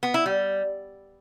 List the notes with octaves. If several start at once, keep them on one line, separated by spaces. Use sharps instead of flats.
B3
E4
G3